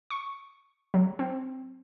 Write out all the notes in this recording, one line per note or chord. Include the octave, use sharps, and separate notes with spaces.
C#6
F#3
C4